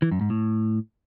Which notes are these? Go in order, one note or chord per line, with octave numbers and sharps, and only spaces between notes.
E3
F#2
G#2
A2